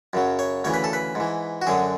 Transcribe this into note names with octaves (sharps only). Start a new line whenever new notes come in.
F#2 C#3 F#3
C#5
D2 C#3 E3 C#5
B4
A4
B4
G#2 E3
F#4
F#2 D3 F#3 G#4